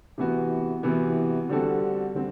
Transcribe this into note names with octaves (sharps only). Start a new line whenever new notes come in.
C3 E3 B3 F#4
C3 E3 B3 F#4
D3 G3 C4 F#4 A4
D3 G3 C4